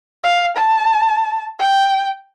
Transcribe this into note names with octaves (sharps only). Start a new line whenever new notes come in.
F5
A5
G5